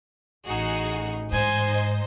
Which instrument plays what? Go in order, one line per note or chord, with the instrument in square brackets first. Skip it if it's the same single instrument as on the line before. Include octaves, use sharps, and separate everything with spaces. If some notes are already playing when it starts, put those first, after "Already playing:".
[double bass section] A1 [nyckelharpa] D#4 [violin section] F#4 G#4 F#5
[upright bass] G#2 [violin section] D#4 C5 D#5 [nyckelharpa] G#5